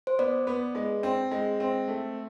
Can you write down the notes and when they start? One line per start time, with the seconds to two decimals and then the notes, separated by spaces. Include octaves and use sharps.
0.07 C5
0.19 B3 D5
0.47 B3
0.75 G#3
1.03 C4
1.31 G#3
1.60 C4
1.88 A3